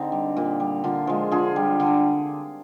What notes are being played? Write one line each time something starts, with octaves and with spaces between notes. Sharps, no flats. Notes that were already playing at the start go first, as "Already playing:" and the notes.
Already playing: D3 C4 D#4
G3
A#2
G3
D3 D4 F4
F3 G#3
D3 F4 G#4
G3
D3